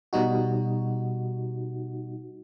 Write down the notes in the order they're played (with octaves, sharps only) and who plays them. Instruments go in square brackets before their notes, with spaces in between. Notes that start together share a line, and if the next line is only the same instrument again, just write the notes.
[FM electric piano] B2 G3 D#4 F#4